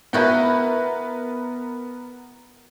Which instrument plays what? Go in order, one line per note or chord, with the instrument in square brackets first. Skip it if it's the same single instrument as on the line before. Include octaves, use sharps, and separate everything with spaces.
[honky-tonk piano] B3 A#4 B4 [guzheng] E4 F#4 G5